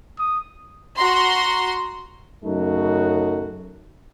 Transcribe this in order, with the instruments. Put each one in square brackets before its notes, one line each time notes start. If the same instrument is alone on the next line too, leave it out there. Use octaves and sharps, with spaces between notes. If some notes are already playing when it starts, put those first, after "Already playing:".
[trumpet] D#6
[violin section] F#4 A#5 C6
[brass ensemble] F#2 C#3 A3 D#4 F#4